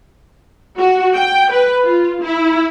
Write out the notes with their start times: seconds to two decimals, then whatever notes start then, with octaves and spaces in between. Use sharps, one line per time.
0.78 F#4
1.16 G5
1.52 B4
1.83 F4
2.23 E4